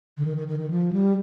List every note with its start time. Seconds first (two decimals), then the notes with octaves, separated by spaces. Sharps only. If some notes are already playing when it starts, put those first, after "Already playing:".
0.18 D3
0.25 D#3
0.37 D#3
0.48 D#3
0.59 D#3
0.70 F3
0.93 G3